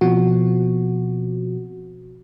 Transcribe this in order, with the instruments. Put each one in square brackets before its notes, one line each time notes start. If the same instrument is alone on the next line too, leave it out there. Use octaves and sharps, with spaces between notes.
[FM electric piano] B2 F3 C4 F#4